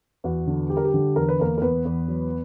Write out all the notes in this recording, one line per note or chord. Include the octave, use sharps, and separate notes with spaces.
E2 F#4
D3
G3 G4
A#4
G4
D3
E2 A#4
B4
E2 A#3 A#4
A#4
E2 B3 B4
E2
F#3